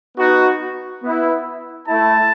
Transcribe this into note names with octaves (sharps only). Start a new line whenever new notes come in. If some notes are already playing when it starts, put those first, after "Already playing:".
B3 D#4 F#4
B3 E4
A3 E4 A5